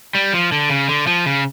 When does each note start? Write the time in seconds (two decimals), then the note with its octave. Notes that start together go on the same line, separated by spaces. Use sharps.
0.15 G3
0.34 F3
0.52 D3
0.69 C#3
0.89 D3
1.07 F3
1.26 C#3